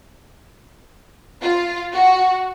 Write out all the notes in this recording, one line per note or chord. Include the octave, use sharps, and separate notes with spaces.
F4
F#4